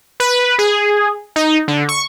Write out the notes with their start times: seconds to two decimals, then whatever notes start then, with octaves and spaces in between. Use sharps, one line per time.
0.20 B4
0.59 G#4
1.36 D#4
1.68 D3
1.89 C#6